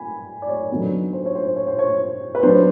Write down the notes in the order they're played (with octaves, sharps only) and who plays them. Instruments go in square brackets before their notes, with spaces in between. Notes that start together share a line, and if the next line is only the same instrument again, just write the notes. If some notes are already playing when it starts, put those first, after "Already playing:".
Already playing: [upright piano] G#5 B5
D5
C#5
D3 F#3 B3 D#4
C5
C#5
C5
C#5
C5
C#5
B4
F#3 B3 D4 C5